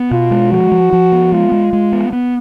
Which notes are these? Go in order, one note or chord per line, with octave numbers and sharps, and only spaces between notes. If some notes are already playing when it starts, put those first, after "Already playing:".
Already playing: B3
B2 F4
G#3
F3 F#4
F3
F3
B3
G#3 F4
G#3
G#3
B3
B3